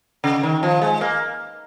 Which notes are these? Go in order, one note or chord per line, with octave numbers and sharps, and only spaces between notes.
C#3
D#3
F3
G#3
A#3